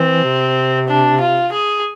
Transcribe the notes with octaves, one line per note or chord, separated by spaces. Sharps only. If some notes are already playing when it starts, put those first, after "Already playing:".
Already playing: E3 C4
C3
D4
F4
G#4